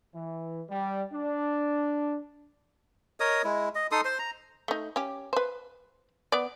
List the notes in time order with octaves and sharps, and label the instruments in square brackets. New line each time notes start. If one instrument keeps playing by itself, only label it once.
[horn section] E3
G3
D4
[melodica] A#4 C#5 D#5 D#6
G#3 E4
D#5
D#4 A4 C6 D#6
C5 C6
A#5
[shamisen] A3 D#4
C#4 G4
B4 C5
B3 D5